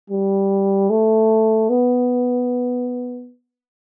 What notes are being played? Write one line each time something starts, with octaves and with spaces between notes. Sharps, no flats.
G3
A3
B3